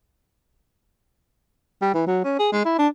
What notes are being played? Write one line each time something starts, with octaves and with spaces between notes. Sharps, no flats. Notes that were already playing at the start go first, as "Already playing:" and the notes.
G3
E3
F#3
C#4
G#4
G#3
E4
D4